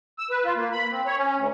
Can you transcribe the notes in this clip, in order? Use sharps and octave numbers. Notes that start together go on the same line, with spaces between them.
E6
B4
F4
A#3
B5
C4
C#5
C#4
D2